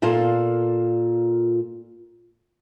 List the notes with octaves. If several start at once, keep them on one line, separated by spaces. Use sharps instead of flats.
A#2 A#3 F4 A4 D5 F5